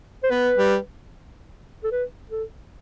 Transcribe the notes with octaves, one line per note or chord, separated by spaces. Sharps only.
C5
B3 B4
G3
A4
B4
A4